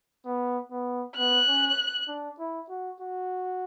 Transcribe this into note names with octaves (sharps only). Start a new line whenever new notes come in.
B3
B3
B3 F#6
C#4
D4
E4
F#4
F#4